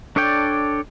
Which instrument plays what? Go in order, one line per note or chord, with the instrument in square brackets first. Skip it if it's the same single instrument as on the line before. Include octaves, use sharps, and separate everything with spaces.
[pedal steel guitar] D4 A4 C#5 D5 G5